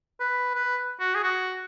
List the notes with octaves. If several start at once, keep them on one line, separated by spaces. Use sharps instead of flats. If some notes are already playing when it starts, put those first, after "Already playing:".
B4
B4
F#4
G#4
F#4